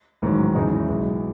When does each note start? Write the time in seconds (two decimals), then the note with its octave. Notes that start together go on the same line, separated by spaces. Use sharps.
0.22 A1 G#2 D#3 F#3
0.55 E2 C#3 G#3 D#4
0.73 E4
0.88 B1 B2 G#3